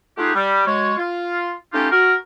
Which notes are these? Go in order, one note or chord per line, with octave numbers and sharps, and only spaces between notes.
A3 D#4 F4 G4 G#4 F#5
G3
F#3 G#3 F#4 C#5
F4
A3 C#4 D#4 F4 G4
F#4 A#4